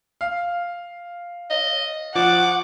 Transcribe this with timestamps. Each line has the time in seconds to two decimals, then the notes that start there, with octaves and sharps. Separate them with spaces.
0.21 F5
1.50 D#5
2.15 F3 F#5 D6